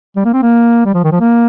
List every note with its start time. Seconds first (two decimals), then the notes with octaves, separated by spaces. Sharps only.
0.16 G3
0.25 A#3
0.34 C4
0.43 A#3
0.86 G3
0.94 F3
1.04 D#3
1.12 F3
1.20 A#3